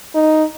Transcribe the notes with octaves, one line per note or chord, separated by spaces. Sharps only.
D#4